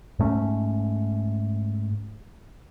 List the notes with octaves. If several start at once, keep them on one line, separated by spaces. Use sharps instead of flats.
G#2 A3 C#4